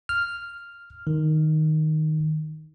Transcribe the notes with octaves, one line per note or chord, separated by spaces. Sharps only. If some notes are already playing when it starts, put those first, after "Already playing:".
F6
D#3